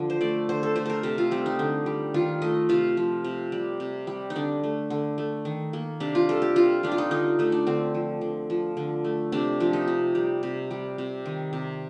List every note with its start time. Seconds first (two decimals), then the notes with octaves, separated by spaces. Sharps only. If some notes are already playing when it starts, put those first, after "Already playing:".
Already playing: D3 F3
0.10 C5
0.21 A3 D5
0.49 D3 C5
0.63 A4
0.76 A3 C5
0.86 A4 A#4
1.03 C3 A4
1.18 F4
1.31 G3 C4
1.46 D#4
1.59 D3
1.86 G3
2.14 D#3 F4
2.42 A3 D#5
2.69 C3 F4
2.97 F3
3.24 C3
3.52 G3
3.80 C3
4.07 G3
4.30 D#4
4.36 D3 D4
4.63 A3
4.90 D3
5.18 A3
5.45 D#3
5.73 A#3
6.00 C3 D4
6.15 F4
6.29 G3 A4
6.42 G4
6.56 C3 F4
6.83 G3 D4
6.92 F4
6.98 D#4
7.11 D3 D#4
7.39 A3 D#4
7.52 D4
7.67 D3 C4
7.94 F3
8.21 D3
8.50 F3
8.77 D3
9.04 A3
9.32 C3 D4
9.60 F3 D4
9.73 D#4
9.88 C3
10.15 G3
10.43 C3
10.71 G3
10.98 C3
11.26 D#3
11.53 C3